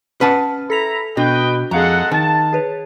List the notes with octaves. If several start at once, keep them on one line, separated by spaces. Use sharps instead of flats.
C#4 B4 F#5 A5 F6
E4 A4 A#5 B6 F7
B2 D4 F#4 B4 D#5 G5
F2 G#3 G#4 A4 F5 F#5 A#5
D#3 A5
G#4 B4 C#5